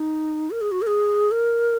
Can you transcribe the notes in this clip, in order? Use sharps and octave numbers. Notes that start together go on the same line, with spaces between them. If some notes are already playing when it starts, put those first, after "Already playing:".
Already playing: D#4
A#4
G#4
F#4
A#4
G#4
A#4